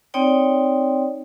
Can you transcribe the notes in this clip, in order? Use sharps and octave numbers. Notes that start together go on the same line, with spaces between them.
C4 D#4 C#5 D5 G5